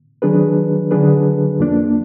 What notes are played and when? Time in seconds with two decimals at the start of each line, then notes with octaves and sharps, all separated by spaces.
0.22 D#3 F#3 D4 G#4 B4
0.91 D3 F#3 D4 G#4 B4
1.59 F2 F3 A#3 D4